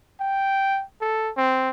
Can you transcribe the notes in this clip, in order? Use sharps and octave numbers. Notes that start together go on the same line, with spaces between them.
G5
A4
C4